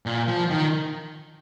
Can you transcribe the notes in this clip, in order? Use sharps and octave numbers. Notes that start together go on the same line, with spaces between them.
A#2
F3
D#3